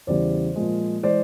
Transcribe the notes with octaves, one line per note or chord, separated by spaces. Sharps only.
E2 C#3 E3 G3 C5 D5
A#2 F3 G#3
E3 G#3 C5 D5